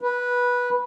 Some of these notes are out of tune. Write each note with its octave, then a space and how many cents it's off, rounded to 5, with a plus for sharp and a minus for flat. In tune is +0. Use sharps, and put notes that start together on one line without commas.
B4 -10